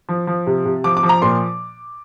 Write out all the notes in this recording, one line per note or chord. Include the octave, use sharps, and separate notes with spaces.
F3
F3
C3
C3
F3 D6
D6
F3
A#5
A#2 C6